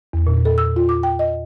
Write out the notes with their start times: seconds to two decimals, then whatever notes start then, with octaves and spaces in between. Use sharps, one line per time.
0.13 E2
0.27 A#2
0.45 A4
0.58 E6
0.76 F4
0.89 D6
1.03 G5
1.19 D#5